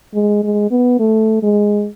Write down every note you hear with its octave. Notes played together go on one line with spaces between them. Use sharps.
G#3
G#3
B3
A3
G#3